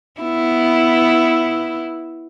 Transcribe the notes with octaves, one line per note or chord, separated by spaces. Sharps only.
B3 E4